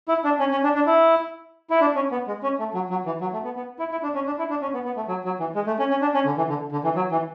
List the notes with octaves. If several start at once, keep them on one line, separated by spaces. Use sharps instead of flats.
E4
D4
C#4
C#4
D4
D4
E4
E4
D4
C#4
B3
G#3
C#4
A3
F#3
F#3
E3
F#3
A3
B3
B3
E4
E4
D4
C#4
D4
E4
D4
C#4
B3
B3
A3
F#3
F#3
E3
G#3
A3
C#4
C#4
D4
C#4
D3
E3
D3
D3
E3
F#3
E3